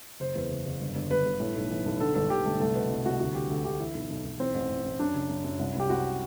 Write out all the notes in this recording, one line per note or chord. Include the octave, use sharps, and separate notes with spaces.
F#1 C5
E2
F#1
F#1
G1
G1
G1 B4
G1
A2
B1
E3
B1
D3 A4
G1 A4
G1 G4
G1 A3
C2 A3
B2 B3
C2
C2 F#4
D2 F#4
D2 G4
D2 A4
D2 G4
E3 E4
B1
B1
B1
E3 C4
A1
A1
A1
F#2 D4
F#1
F#2
F#2
C2
C2 G4
C2 F#4